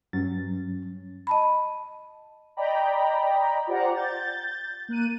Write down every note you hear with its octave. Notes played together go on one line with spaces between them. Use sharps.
G2 F#3 C#4 A6
D#5 A5 B5
D5 D#5 G5 A#5 B5
F4 G4 C5 D5 F#5 A#5
G6 A6
A#3 F#6 D#7